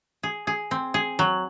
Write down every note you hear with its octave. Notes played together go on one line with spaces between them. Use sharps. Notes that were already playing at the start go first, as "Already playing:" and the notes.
G#4
G#4
C4
G#4
F#3